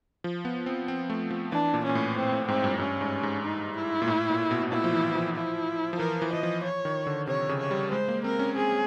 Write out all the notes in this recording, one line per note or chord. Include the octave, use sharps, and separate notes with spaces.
F3
B3
C4
C4
A3
F3
E3 D4
A#2
A#2 C#4
A2
A2 C4
A2
G#2 C4
G2
G2 C#4
G#2
G#2
D#4
E4
A#2
A2
A#2
B2
B2
A#2 E4
F3
E3
E3
F3
E4
F3
E3 A#4
E3
E3 D#5
F3
C#5
D#3
D3
C3 C#5
C#3
C#5
G3
G#3 C5
A#3
C4 A#4
C#4
C4 G#4